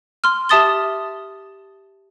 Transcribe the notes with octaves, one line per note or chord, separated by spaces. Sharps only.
C6 F6
G4 E5 A5 D#6 A6 G7